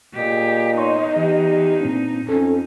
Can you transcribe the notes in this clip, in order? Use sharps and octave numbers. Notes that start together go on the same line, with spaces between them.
A#2 G4 G#4 D#5
E2 D#4 C#5 C6 C#6
E3 G4
A#2 C4 D4
F2 C#4 D#4 A4